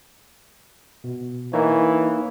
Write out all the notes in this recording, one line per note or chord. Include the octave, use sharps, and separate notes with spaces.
B2
E3 A#3 D#4 C#5